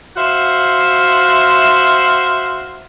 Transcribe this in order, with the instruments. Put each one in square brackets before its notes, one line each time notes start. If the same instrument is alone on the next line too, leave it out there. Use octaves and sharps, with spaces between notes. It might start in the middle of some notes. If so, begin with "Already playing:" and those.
[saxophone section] F#4 C5 E5 F5